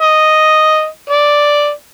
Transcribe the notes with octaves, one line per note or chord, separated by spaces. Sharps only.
D#5
D5